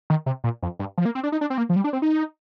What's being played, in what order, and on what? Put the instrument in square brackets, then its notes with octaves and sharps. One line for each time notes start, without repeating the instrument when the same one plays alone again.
[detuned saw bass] D#3
C3
A#2
F2
G2
F3
A#3
C4
D4
D#4
D4
C4
A#3
F3
G3
D4
C4
D#4